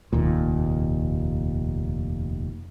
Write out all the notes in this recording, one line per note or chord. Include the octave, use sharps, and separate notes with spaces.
F1 D#2 A#2